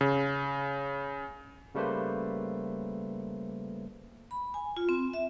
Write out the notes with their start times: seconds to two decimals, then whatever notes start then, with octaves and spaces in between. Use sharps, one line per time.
0.01 C#3
1.75 C#3 G3 A3 A#3 B4 C5
4.31 B5
4.54 G#5
4.77 F4
4.89 C4
5.14 E5